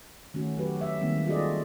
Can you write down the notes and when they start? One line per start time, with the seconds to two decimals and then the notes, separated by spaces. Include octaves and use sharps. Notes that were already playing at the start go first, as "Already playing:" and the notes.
0.34 D#3 A3 C#4 F#4
0.57 F#3 F#4 G4 B4
0.81 E5
1.01 D#3 G3 G#3 A#3 C4
1.27 F4 F#4 G#4 A4 D5 D#5